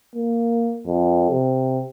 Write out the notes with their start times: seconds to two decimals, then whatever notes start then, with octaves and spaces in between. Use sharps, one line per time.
0.16 A#3
0.86 F2
1.30 C3